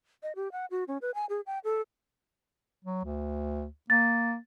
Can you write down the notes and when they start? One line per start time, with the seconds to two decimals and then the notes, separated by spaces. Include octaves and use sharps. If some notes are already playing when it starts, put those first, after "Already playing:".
0.23 D#5
0.36 G4
0.52 F#5
0.71 F#4
0.88 C#4
1.02 B4
1.15 G#5
1.30 G#4
1.46 G5
1.64 A4
2.85 F#3
3.04 D2
3.90 A#3 A6